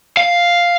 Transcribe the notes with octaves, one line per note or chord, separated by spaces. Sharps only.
F5